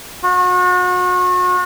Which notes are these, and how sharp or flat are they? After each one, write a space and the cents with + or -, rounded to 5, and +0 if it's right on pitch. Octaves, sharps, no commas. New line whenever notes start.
F#4 -35